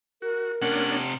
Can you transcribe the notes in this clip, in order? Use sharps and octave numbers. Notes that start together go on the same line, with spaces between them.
F#4 A#4
C3 A#3 C#4 D4 F#5